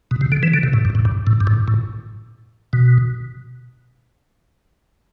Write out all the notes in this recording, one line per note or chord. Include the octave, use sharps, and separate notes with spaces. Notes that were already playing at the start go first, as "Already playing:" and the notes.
B2
C3
D3
E3
D3
C3
A2
G2
A2
G2
A2
G2
A2
A2
B2